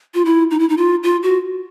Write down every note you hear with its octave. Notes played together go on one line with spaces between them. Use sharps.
F4
E4
D#4
E4
D#4
F4
F4
F#4